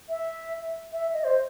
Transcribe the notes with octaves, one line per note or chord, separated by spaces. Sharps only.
E5
E5
D#5
C5